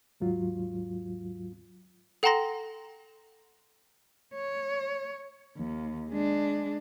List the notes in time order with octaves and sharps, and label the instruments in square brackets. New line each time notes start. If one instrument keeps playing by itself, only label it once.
[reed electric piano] D#2 G#2 F#3 F4
[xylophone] A4 F#5 G5 A#5 C6 A#6
[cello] C#5
D#2
G#3 D4